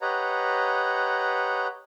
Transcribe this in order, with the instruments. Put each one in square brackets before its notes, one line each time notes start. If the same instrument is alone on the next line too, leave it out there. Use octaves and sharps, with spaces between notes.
[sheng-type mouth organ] G4 B4 C#5 D#5 F#5 A#5